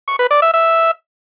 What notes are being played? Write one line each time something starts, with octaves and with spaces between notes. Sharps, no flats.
C#6
B4
D5
E5
E5